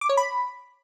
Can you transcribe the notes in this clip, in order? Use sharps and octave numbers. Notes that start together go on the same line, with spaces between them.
D6
C#5
B5